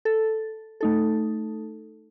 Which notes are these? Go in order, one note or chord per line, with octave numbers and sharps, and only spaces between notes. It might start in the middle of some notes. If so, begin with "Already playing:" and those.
A4
A3 D#4 A4